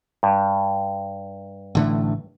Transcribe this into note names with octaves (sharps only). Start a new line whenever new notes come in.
G2
A1 D3 A3